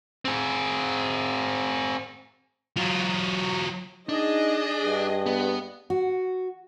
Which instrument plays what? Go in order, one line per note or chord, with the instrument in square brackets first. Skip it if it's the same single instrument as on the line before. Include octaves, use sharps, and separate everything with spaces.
[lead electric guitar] C4 G#4
[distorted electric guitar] F#3 F4
[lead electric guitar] D4 [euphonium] D#4 [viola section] G#4 D#5
[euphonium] G2
[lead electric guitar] B3
[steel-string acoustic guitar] F#4